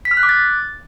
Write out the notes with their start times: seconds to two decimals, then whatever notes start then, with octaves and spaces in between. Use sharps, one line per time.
0.05 B6
0.11 F6
0.17 F#6
0.23 D6
0.29 A6